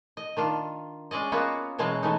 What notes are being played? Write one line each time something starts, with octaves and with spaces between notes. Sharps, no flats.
D#5
D#3 D4 F4
G#3 C#4 D5 D#5
A#3 B3 C#4 F4 F#4 C#5
B2 E3 F#3 G#3 C#4
E3 A3 D#4